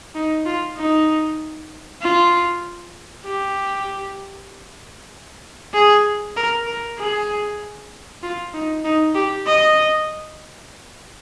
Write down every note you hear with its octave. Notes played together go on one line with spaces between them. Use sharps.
D#4
F4
D#4
F4
G4
G#4
A#4
A#4
G#4
F4
D#4
D#4
G4
D#5